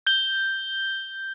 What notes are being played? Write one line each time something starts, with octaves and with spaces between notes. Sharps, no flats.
G6 G7